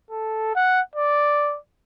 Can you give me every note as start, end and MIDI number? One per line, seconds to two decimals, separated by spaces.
0.11 0.53 69
0.55 0.81 78
0.95 1.57 74